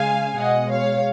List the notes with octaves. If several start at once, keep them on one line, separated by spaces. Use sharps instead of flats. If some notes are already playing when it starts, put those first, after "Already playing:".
Already playing: C#3 G#3 F5 G#5
B2 G#3 D#5 F#5
C#5 F5